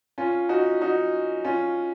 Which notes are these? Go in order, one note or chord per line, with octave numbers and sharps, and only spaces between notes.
C#4 F4
D#4 F#4
D#4 F#4
C#4 F4